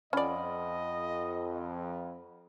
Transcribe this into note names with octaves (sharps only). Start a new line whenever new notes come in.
F2 C#4 D5 D#5 F#5 B5